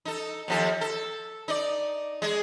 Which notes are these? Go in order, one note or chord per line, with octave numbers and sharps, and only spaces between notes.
D#4 A4
D#2 F3 A4
A4
D#4 D5
G#3 G#4